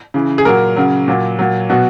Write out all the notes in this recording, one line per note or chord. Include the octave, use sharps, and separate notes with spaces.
C#3 E3
G#4
A#2 F#3 A#4
C#3 F#3
A#2 F#3
A#2 F#3
B2 F#3 F#4